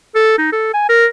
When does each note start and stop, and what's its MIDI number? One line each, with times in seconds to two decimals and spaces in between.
0.15 0.37 69
0.38 0.52 63
0.52 0.71 69
0.74 0.85 80
0.89 1.06 70